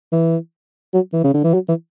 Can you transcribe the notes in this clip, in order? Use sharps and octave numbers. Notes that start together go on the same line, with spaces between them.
E3
F#3
E3
C#3
D3
E3
F#3
E3